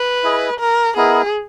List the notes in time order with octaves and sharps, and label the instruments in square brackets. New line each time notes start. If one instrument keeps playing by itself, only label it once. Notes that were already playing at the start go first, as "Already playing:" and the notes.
Already playing: [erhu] B4
[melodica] E4 G#4 D#5
[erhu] A#4
[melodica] B3 E4 A#4 D#5 [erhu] G#4